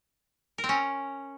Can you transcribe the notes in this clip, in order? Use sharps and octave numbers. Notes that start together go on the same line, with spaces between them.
A#4
C4
C#4